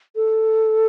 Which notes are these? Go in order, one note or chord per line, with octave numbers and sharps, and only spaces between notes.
A4